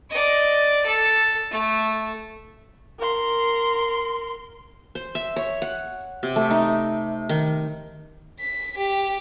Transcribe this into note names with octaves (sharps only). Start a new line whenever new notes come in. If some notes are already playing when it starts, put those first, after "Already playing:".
D5 D#5
A4
A3
A#4 C6
C5
E5
C#5
F#5
C3
A3
D#4
D#3
B6
G4